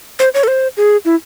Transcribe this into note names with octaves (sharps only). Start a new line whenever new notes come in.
C5
C#5
A4
C5
G#4
E4